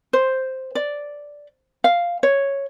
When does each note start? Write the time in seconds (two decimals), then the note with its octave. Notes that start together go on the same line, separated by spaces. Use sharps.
0.13 C5
0.75 D5
1.84 F5
2.23 C#5